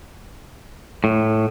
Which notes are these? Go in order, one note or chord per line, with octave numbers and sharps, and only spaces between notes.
A2